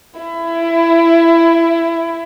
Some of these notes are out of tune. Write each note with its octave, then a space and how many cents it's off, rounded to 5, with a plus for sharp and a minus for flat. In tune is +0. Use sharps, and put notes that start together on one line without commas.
E4 +20